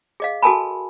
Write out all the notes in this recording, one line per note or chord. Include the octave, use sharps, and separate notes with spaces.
G#4 D#5 F5
F#4 A4 A#4 G#5 A5 B5